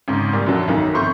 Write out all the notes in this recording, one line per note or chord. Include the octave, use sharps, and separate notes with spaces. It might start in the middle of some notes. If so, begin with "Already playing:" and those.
G#1 G#2 C#3
A#2 G3
F#2 D3 F3 F#3
B1 F#2 D#3 F#3
G1 F2 C6 C#6 G6